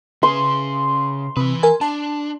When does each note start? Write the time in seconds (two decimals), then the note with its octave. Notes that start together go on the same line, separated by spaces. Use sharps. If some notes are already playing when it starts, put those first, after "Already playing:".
0.23 C#3 G#4 C6
1.37 C3 E3 B4
1.63 A#4 G#5
1.81 D4 A5